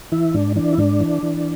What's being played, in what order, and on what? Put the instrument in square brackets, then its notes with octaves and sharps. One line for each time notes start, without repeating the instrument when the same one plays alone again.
[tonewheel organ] E3 E4
G#2 D4
E3 D4
E4
G#2 D4
E3
E3